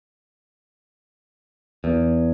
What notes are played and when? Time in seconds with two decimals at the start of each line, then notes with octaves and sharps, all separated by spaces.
1.84 E2